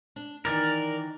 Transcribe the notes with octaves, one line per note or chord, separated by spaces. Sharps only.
D4
D#3 E3 A#4 D5